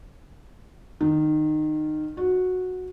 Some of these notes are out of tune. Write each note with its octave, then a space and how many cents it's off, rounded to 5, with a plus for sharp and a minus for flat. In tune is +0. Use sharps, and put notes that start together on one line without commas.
D#3 -20
F#4 -10